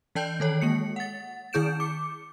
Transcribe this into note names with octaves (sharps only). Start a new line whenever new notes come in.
E3 D5 G5 A5 G6
D#3 A4 C#5
G#3 A#3 C#7
F#5 A6
D#3 E4 G#4 G6 D7 E7
D6 C#7